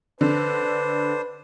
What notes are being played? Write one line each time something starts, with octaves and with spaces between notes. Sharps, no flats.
D3 D4 B4 C5